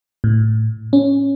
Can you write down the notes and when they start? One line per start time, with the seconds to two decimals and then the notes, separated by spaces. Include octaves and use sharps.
0.24 A2
0.93 C#4